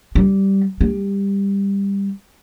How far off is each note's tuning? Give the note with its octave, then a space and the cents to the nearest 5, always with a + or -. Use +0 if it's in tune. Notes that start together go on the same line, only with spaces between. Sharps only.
G3 -10
G3 +15